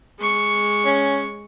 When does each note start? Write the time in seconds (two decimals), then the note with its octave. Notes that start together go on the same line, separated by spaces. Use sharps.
0.19 G#3 C#6
0.85 C#4